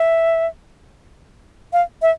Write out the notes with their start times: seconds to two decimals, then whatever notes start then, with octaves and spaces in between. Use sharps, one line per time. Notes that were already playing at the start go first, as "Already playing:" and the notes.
Already playing: E5
1.73 F5
2.02 E5